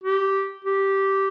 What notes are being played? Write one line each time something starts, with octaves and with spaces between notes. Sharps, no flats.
G4
G4